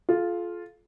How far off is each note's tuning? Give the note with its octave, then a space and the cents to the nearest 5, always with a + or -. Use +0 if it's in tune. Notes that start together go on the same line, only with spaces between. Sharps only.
F4 +0 A4 -45